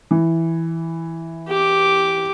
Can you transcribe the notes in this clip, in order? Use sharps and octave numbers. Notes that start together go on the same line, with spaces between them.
E3
G4 D6